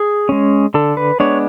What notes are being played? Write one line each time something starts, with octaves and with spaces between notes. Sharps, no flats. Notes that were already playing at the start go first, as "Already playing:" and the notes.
Already playing: G#4
G#3 C#4
D3 A4
B4
G#3 B3 D4 C#5